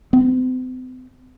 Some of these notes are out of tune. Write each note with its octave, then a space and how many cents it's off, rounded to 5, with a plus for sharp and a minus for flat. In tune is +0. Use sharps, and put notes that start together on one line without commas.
C4 -45